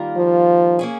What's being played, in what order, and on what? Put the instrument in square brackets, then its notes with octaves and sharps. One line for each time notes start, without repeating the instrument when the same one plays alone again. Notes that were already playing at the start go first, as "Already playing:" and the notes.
Already playing: [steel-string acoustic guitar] D#3 G3 A#3 F4 A#4
[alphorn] F3
[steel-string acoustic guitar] A#3 C#4 G#4